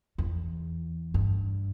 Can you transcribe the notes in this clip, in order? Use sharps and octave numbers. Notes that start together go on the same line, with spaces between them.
E2
G2